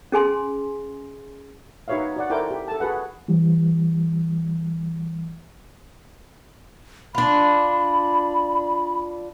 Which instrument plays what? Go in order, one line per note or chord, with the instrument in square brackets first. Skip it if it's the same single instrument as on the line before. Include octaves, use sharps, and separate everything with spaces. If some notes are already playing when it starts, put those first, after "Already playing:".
[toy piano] C#4 G#4 G#5 C6
[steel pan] D#4 F#4 B4 C#5 E5 F5
F#4 D5 F#5
E4 A4 A#4 C5 G5 D6
G4
A4 A5
F#4 G#4 B4 F#5
[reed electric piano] E3 G3
[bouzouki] D4 F4 [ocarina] B5